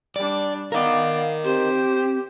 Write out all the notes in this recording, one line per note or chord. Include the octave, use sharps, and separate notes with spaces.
G3 D4 D5
B3 A#4 D5 D#5 F5
C4 G4 C5